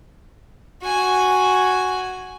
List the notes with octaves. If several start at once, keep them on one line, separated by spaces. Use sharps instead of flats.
F#4 G#5